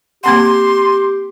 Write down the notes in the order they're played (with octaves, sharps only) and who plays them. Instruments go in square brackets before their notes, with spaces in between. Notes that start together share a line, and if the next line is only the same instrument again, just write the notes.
[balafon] A#3 C4 F#5 [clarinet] G4 [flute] C6